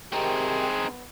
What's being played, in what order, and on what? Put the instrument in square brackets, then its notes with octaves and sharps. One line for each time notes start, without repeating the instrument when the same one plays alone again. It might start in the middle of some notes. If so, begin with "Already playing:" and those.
[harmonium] C3 D#3 G4 [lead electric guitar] C4 D#4 [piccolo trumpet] G#4
[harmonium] B3